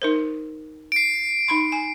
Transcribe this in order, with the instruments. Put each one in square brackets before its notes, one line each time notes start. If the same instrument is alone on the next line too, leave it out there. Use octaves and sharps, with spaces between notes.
[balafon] D#4 A#4 C5
[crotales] C7 D7
[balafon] D#4 B5 C6
G#5